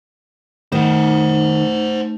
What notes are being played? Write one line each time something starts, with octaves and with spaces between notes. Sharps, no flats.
D#3 A3 D#4 C5 F#5